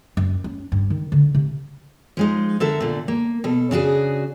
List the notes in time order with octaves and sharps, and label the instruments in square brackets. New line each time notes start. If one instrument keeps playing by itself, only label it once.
[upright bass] F#2
C#4
G2
D#3
D3
C3
[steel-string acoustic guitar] F3 G#3 D#4
D3 A4 A#4 E5
A#2 D3
A#3
B2 A4
C#3 D4 F#4 G#4